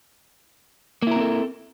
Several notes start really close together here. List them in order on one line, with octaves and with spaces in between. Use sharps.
A#3 E4 A#4 C4 A4